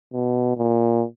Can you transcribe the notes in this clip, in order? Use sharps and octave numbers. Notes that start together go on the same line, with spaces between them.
B2
A#2